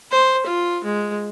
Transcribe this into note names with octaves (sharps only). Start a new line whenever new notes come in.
C5
F4
G#3